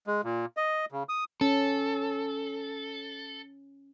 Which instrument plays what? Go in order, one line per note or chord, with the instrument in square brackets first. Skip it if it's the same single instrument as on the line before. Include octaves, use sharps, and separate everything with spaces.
[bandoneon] G#3
A#2
D#5
C#3
D#6
[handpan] C#4 [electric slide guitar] A4